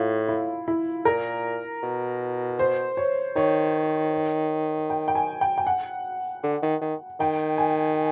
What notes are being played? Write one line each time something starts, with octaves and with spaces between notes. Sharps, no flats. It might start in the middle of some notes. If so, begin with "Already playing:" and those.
Already playing: A2 F4
E4
E4
A#2 A#4
B2
C5
C#5
D#3 C#5
G5
G5
G#5
G5
G5
F#5
D3
D#3
D#3
D#3 G5
G#5